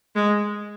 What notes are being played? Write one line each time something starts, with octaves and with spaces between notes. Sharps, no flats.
G#3